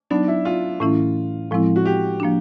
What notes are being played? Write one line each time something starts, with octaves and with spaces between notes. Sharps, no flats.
F#3 B3 D4 D#4
E4
F4
A2 E3 A3 C#4 E4
A2 F3 G#3 C4 E4
F#4
G4
F3 A#3 D4